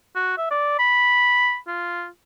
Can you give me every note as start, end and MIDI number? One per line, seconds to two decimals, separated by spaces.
0.15 0.33 66
0.38 0.49 76
0.50 0.75 74
0.79 1.57 83
1.67 2.07 65